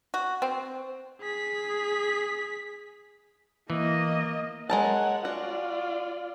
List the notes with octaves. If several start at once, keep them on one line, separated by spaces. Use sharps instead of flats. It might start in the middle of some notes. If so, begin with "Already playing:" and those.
F#4
C4
G#4 B6
E3 A#3 D#5
G#3 A#4 C#5 F#5 A5
F4 F#4 D5